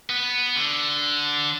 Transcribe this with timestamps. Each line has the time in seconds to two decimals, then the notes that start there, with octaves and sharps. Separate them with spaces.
0.10 B3
0.56 D3